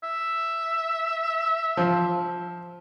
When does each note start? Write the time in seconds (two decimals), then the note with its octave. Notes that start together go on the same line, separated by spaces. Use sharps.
0.04 E5
1.77 F3